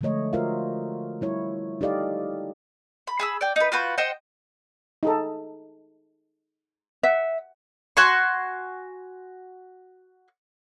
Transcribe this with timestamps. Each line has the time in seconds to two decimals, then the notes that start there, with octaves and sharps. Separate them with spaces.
0.01 D3 F3 G#3 A3 C#5 D#5
0.33 F4 F#4 A#4 C5 E5 F5
1.21 G3 E4 C#5
1.81 D#4 G4 A4 D5 D#5 F5
3.07 B5
3.19 G#4 B5 E6
3.41 D5 G5
3.56 D#4 B4
3.72 F4 F#4 B4 G6
3.98 C5 D#5 F#5 G5
5.03 D#4 G#4 A4
7.03 E5 F#5
7.97 F#4 G#5 C6 C#6